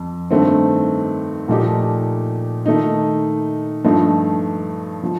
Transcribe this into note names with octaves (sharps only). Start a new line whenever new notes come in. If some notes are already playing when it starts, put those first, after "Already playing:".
Already playing: F2
G2 D#3 A3 C4
A#2 F3 A3 D#4 G4
D#3 A3 D#4
G2 F3 A3 D#4
F3